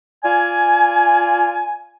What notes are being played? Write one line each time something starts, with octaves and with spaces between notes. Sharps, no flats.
F4 D5 G#5